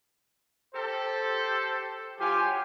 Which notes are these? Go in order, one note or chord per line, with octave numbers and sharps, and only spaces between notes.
G4 A4 C5
F#3 F4 G4 G#5